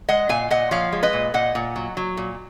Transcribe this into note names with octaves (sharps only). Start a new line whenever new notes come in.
G#3 D#5 F#5
A#2 F5 G#5
A#2 D#5 F#5
F3 C#5 F5
G#3
B4 D#5
A#2
A#2 D#5 F#5
A#2
F#3
F#3
A#2